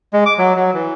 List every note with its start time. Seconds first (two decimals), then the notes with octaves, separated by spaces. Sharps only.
0.13 G#3
0.26 D6
0.38 F#3
0.56 F#3
0.74 E3